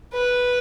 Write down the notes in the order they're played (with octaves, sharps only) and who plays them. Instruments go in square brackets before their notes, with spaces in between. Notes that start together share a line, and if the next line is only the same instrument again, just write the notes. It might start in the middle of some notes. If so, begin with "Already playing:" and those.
[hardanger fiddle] B4